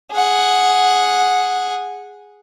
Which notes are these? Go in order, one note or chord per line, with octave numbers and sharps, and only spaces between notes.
G#4 F#5